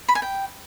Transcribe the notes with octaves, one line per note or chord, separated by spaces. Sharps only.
B5
G#5
G5